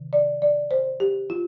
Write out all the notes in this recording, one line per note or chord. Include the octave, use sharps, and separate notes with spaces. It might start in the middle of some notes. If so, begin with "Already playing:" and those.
Already playing: C3 D#3
D5
D5
C5
G4
F4